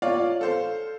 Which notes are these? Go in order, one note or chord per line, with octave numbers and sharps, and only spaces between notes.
F4 C#5 D5 F5
A4 C5 F5